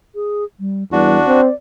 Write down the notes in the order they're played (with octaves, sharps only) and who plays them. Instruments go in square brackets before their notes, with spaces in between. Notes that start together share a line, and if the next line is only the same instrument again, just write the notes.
[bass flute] G#4
G3
[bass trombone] E2 [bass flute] G3 [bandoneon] D4 F#4
[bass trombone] C4 [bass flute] D5